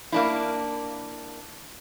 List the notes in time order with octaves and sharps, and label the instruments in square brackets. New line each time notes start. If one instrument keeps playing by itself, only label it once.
[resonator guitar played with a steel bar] A#3 D4 E4